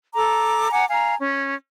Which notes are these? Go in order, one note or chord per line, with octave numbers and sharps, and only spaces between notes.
A4 A#5 D6
F#5 G#5 A#5 D6
F5 G#5 A#5
C#4